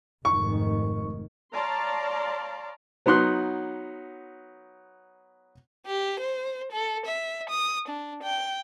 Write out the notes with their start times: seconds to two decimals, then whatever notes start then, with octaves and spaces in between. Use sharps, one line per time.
0.25 F1 G#2 D#3 C#6
1.53 C#5 D5 F5 A5 A#5 C6
3.06 F#3 B3 D#4 C6 F#6
5.86 G4
6.20 C5
6.72 A4
7.06 E5
7.50 D#6
7.88 D4
8.23 G5